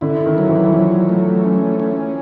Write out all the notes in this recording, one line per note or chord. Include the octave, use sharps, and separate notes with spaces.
D3 E4
D#3
F#3
E3
F3 F#3
A3
C#4
C#4